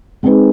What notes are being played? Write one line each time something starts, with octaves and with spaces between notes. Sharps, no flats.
G#3 C4 D#4 G#4 B4